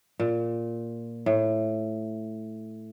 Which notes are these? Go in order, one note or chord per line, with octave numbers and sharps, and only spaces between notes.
A#2
A2